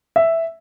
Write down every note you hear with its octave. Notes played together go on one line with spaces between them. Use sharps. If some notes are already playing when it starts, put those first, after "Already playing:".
E5